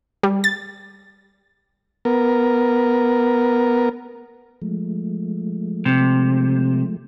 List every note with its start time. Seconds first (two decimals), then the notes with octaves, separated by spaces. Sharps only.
0.23 G3
0.44 A6
2.05 B3 A#4
4.62 F3 G#3 A3
5.85 C3